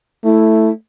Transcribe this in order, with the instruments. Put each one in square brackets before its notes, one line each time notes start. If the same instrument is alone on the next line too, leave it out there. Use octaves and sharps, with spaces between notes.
[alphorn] A3 [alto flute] E4